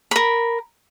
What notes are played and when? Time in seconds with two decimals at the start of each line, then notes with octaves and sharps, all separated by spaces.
0.11 A#4 B5